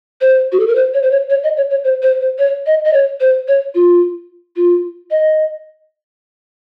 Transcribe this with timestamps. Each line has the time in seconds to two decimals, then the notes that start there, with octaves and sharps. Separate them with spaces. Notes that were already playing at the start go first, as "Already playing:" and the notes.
0.21 C5
0.52 F#4
0.60 A4
0.67 A#4
0.75 C5
0.94 C#5
1.03 C5
1.11 C#5
1.30 C#5
1.43 D#5
1.57 C#5
1.70 C#5
1.84 C5
2.03 C5
2.21 C5
2.39 C#5
2.66 D#5
2.85 D#5
2.93 C#5
3.21 C5
3.48 C#5
3.75 F4
4.56 F4
5.11 D#5